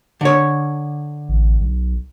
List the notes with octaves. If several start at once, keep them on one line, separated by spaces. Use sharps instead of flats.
D3 C#5
A1
B1